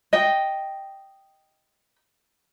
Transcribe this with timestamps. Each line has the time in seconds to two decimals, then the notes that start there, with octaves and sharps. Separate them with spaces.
0.13 D#5 G5